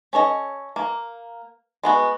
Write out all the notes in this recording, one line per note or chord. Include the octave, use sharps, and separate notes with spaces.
C#4 A4 C#5 D#5
A#3
G#3 B3 F#4